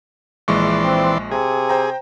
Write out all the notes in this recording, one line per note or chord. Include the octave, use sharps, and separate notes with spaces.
A#1 E3 G#3 D5 C6 C#6
C4
C3 G#4
C5 G5 A#5